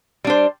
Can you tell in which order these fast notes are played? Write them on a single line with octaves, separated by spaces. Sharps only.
G3 D4 C5